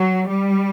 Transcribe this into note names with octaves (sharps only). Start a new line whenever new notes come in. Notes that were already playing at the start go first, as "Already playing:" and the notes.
Already playing: F#3
G3